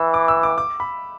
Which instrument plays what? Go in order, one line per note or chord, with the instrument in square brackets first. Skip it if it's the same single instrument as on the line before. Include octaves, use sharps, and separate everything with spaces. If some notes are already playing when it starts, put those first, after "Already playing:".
Already playing: [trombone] E3 [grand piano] E6
[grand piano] D6
E6
D6
D6
B5